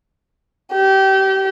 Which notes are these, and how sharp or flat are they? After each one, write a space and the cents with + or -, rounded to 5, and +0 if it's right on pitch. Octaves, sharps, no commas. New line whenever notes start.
G4 -25